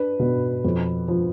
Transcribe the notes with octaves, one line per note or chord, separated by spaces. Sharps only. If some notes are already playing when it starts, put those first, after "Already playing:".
Already playing: D4 B4
B2
F2
F3